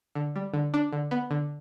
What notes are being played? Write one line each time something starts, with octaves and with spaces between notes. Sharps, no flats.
D3
G3
D3
D4
D3
B3
D3